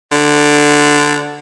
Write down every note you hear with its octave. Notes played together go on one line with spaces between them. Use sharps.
D3